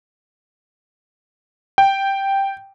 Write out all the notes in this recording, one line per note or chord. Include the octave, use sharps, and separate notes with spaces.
G5